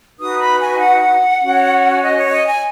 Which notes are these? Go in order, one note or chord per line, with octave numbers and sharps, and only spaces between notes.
D#4 F#4 B4 D#6
B5
G#5
F#5
C#4 F#4 C#5
D#5
C#5
D#5
G#5